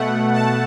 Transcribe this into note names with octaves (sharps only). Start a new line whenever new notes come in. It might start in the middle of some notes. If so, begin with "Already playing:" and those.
Already playing: B2 A3 F#5
A5